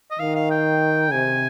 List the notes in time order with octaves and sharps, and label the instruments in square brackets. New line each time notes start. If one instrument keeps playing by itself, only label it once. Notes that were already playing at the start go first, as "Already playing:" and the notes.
[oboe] D#5
[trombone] D#3 [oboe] F5
[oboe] F5
G5
[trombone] C3 [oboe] G#5